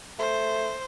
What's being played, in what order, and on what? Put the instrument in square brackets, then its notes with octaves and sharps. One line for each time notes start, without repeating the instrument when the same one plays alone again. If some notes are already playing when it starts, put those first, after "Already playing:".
[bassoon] A3 [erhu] C5